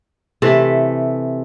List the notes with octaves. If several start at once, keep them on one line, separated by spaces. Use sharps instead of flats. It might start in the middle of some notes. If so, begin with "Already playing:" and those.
C3 E3 A3 E5